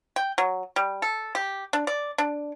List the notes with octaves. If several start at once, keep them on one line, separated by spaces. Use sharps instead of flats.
G5
F#3
G3
A4
G4
D4
D5
D4